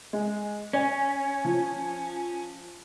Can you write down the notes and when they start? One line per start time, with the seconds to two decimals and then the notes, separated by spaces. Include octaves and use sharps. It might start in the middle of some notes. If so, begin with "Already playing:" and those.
0.13 G#3
0.73 C#4 C#5 G#5
1.45 F3